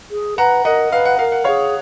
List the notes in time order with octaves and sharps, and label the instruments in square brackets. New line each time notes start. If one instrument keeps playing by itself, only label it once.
[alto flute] G#4
[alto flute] B4 [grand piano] F#5 A#5
[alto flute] A#4 [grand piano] D#5 F#5
[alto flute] B4 [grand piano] F5
[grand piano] F#5
[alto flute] A#4 [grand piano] F5
[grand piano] F#5
[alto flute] G#4 [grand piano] C#5 F5